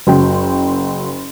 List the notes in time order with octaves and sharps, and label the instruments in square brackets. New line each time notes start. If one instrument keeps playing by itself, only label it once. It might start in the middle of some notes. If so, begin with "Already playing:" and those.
[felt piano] F#1 F#3 G5 C6